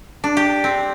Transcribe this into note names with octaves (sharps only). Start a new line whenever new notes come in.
D4
G4
C4